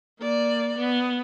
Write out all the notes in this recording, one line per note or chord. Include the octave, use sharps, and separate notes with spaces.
A#3 D5
B3